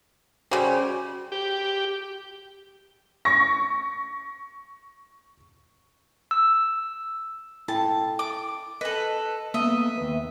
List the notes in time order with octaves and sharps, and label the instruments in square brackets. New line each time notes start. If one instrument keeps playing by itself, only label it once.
[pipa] C#3 G3 [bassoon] F#4 [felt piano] C5
[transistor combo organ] G4
[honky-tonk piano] C#6 A#6
[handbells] E6
[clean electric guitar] E4 A4 G5 [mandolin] A5
[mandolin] D6
[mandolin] A4 B4 [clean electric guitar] D#5
[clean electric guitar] A#3 B3 A4 [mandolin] D#5 E5
[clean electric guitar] D#2 B4